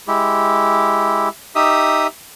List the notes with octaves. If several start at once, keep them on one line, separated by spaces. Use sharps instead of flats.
G#3 E4 G4
D#4 G4 E5 D#6